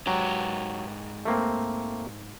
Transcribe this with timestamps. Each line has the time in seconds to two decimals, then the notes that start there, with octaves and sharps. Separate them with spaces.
0.07 G#2 F#3 G4
1.25 A3 A#3 C4